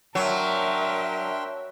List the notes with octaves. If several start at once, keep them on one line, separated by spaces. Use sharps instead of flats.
F#3 D4 A#4 E5 G5 C6